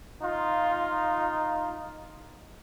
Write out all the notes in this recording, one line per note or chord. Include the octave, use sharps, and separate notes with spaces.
D#4 F4